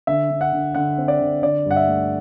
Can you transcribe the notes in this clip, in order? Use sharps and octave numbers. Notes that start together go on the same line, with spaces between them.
D3 E5
D3
F#5
D3
D3 F#5
C4
D5
D3
D3 D5
G2 F#5
E5
A3